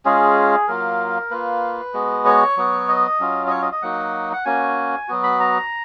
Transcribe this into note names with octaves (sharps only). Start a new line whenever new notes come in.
G#3 C#4 F4 G#4
F#3 A#3 F4 A#4
A#3 F4 B4
G#3 B3 F#4
C#5
F#3 B3 F#4
D#5
F#3 C#4 F4
D#5
C#5
D#5
D#5
F#3 A#3 D#4 F#4 F#5
F#5
A#3 C#4 F#4 G#5
F#3 B3 F#4
B5
A#5